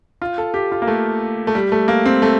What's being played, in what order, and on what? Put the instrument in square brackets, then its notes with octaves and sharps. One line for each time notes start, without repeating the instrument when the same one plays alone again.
[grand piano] F4
A4
G4
F4
A#3
A3
A3
G3
A3
A#3
C4
A3